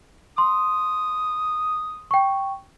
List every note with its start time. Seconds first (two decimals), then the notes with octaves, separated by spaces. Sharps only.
0.38 C6 D#6
2.11 G5 C#6